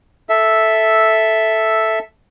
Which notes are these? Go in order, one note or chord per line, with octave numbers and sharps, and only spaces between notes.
A4 E5